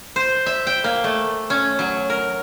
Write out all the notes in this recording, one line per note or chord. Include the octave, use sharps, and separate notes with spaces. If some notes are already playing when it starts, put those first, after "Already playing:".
C5
E5
G5
A#3
A3
C#4
F#3
A#4